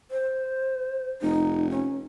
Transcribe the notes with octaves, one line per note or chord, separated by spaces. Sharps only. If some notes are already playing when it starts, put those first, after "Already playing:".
C5
F1 D#4
C#4